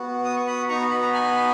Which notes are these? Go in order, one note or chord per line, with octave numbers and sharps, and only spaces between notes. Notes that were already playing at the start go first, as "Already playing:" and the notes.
Already playing: B3 F#4
D#6
C#6
B5 D#6
B3 D#4 F#4 A#5 C#6
B5
A#5
G#5 B5